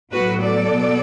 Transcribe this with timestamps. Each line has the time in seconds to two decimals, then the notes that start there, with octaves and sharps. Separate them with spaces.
0.12 A2 F#3 B3 F#4 B4
0.41 A4 D5
0.70 B2 B3